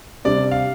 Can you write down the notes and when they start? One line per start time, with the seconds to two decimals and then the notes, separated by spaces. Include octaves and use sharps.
0.25 C3 G3 D4 D5
0.51 F5